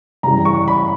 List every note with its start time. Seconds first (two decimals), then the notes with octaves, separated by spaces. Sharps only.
0.23 C#3 E3 G3 A#5
0.45 C#6
0.68 B5